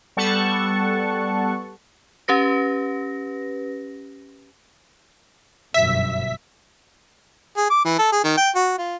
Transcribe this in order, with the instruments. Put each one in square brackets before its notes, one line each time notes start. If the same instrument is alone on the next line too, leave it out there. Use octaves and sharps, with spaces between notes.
[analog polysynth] G3 B3 A4 F#5 A5 C#6
[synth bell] C#4 G4 B4 A#6
[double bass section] G1 F#2 B2 [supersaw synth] E5 B6
[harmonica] G#4
D6
E3
A4
G#4
D#3
G5
F#4
F4